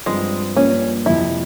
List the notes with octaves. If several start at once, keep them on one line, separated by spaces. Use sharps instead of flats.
G2 F3 G#3 C4
G2 F3 A#3 C#4
F2 C3 F3 E4